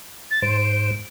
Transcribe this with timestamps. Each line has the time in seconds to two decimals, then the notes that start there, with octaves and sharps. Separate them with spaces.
0.30 A6
0.42 G#2 C5 D7